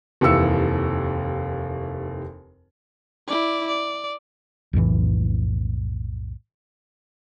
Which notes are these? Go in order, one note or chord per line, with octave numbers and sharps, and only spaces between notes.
F1 D#2 E3 E6 C#7
E4 D5
D5
B1 F2 A2 E3